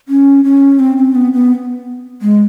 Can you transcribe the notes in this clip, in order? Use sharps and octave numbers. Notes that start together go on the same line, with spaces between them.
C#4
C#4
C4
C4
B3
B3
G#3